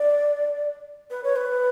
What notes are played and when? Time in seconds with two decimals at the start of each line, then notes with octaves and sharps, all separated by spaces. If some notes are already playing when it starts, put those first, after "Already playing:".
Already playing: D5
1.11 B4
1.24 C#5
1.36 B4